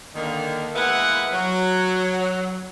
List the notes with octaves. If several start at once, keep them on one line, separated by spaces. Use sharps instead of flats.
D3 D#3 A#3
G#3 A#3 B3 E4 A#4 F#5
F#3